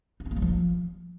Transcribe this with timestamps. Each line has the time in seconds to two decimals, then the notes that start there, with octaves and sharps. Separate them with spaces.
0.20 D#4
0.26 C4
0.31 A#3
0.37 G3
0.42 F3